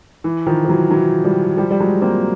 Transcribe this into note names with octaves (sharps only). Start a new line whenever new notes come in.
E3
D#3 F3
F3
E3 F#3
E3 F#3
F3 G3
F3 G3
G3
F#3 G#3
A#3 C4